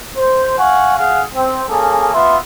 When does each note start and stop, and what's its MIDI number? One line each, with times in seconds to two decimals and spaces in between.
0.17 0.55 72
0.58 0.94 77
0.58 0.94 78
0.58 0.94 80
0.58 0.94 85
0.97 1.22 68
0.97 1.22 77
0.97 1.22 78
0.97 1.22 80
1.33 1.63 60
1.69 2.13 58
1.69 2.13 61
1.69 2.13 68
1.69 2.13 69
2.14 2.36 59
2.14 2.36 65
2.14 2.36 76
2.14 2.36 84